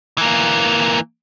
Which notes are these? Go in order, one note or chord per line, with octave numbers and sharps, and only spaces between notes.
E3 A#3